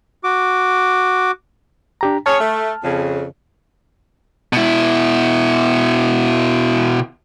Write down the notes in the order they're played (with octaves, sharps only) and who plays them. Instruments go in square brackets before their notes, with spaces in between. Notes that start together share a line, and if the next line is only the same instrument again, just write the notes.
[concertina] F#4 D6
[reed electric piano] D4 G4 A#5
[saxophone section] C#4 G#4 C#5 [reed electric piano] A5 F6
[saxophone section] A3
F2 C#3
[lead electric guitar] B2 E4